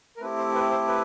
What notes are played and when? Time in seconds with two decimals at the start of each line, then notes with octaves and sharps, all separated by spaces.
0.17 A#4
0.20 A3 C4 E4 G4 B4
0.37 C5
0.55 B4
0.71 C5
0.88 B4